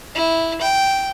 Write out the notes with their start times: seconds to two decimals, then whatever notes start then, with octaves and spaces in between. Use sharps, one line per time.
0.15 E4
0.61 G5